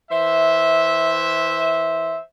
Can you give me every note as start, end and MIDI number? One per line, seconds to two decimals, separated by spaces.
0.11 2.18 52
0.11 2.18 72
0.11 2.18 76